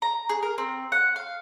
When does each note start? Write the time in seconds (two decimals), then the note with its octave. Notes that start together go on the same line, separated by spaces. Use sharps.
0.02 A#5
0.29 G#4
0.43 A#4
0.58 C4
0.92 F#5
1.16 F5